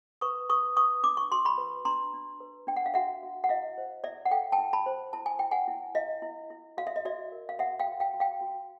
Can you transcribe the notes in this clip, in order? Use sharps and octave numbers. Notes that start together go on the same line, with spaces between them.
B4 C#6 D#6
B4 C#6 D#6
B4 C#6 D#6
D4 D6
C#6
F#4 C6
B5 C#6
B4
D4 A#5 C6
D4
B4
D4 G5
F#5
F5
F#4 E5 F#5
F#4
F#5
E4 D#5 F5
C5
E4 D5 E5
F#5
A4 F5 G5
G5 A5
E4
A5 B5
C5
E4 A5
G#5
E4 G5
F#5 G#5
E4
E4 D#5 F5
E4
E4
F#4 F5
E5
D#5
F#4 D5 E5
A#4
F5
F#4 E5 F#5
F5 G5
F#4
F5 G5
F#4
F5 G5
F#4